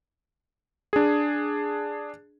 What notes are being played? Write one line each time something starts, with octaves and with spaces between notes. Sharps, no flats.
D4 G#4